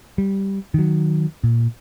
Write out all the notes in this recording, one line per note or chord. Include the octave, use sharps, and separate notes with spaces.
G3
D#3 F#3
A#2